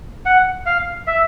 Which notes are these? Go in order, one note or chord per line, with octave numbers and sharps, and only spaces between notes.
F#5
F5
E5